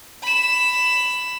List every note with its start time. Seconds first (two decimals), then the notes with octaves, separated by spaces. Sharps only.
0.23 B5 E7